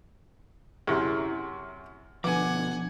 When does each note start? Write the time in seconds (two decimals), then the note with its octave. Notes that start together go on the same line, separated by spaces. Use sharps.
0.87 F#2 C3 E4 G4 G#4 F6
2.24 B2 D3 F3 B4 F#5 G#5 D6